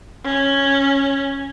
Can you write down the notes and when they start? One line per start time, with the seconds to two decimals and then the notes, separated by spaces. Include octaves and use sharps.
0.24 C#4